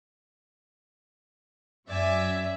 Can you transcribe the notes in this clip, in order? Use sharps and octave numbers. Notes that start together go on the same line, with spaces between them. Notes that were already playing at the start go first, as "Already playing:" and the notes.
F#2 D5 E5 G#5